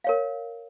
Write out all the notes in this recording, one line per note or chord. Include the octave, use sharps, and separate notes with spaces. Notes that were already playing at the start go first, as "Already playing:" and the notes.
A#4 C#5 F5